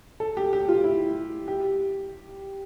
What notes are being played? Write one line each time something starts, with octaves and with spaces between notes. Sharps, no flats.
A4
G4
G4
F4
E4
G4